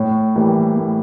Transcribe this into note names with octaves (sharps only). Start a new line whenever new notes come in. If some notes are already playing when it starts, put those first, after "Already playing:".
Already playing: A2 C#5
E3 G3 A#3
A2